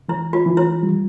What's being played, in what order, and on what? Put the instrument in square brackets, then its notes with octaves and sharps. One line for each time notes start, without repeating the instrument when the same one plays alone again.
[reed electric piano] E3 [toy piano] E4
[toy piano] F4
[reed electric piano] E3
[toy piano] E4
[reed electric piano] G3